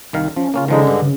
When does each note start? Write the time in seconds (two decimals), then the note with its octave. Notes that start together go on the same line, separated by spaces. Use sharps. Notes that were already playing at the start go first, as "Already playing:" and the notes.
0.13 C2 D#3 F5
0.36 F3 C#4
0.54 C#3 A#3 C#4 F4
0.68 D3 D#3 F3 G#3 D#4
0.87 G2
1.02 C#3